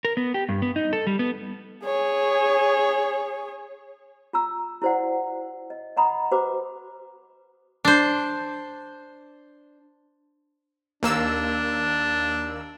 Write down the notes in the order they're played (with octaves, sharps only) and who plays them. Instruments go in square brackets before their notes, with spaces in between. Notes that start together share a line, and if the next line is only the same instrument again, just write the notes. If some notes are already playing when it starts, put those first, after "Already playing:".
[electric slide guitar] A#4
B3
G4
G2
B3
D#4
A4
G3
B3
[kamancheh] G#4 C#5
[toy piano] F4 A#5 E6
E4 F#4 C5 D5 F#5
D#5
D#5 F#5 A#5 B5 D#6
F#4 B4 C5 A#5 D6
[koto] D4 C5
[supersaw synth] D#2 A#3 E6 [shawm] D4